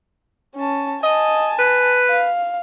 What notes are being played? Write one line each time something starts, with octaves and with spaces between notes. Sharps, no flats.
C#4 A5
D#5 G#5 A5
B4
F5